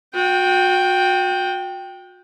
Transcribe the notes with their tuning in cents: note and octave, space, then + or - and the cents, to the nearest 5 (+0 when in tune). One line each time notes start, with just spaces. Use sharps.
F#4 -35 G5 +0